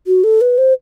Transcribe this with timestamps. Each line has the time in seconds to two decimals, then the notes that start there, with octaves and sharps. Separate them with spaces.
0.07 F#4
0.24 A4
0.41 B4
0.58 C5